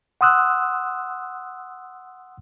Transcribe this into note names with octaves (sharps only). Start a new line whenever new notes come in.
F#5 C6 D#6 E6 F#6